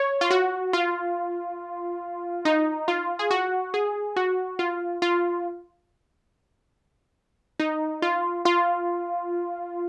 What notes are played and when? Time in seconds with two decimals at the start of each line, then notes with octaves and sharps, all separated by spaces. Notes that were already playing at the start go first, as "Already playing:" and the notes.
Already playing: C#5
0.21 F4
0.30 F#4
0.73 F4
2.45 D#4
2.88 F4
3.19 G#4
3.31 F#4
3.74 G#4
4.16 F#4
4.59 F4
5.02 F4
7.60 D#4
8.02 F4
8.45 F4